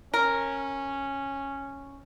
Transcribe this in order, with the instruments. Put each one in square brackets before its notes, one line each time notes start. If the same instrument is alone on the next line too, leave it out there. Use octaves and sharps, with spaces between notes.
[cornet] C#4 [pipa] A#4